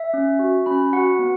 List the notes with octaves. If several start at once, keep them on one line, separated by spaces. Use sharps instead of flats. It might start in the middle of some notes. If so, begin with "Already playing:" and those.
Already playing: E5
C#4
F#4
C#4 B5
F#4 F#5
B3